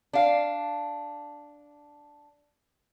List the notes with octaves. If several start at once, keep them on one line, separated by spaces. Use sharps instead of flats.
D4 F5